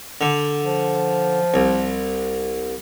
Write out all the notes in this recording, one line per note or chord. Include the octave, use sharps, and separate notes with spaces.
D3
F3
C2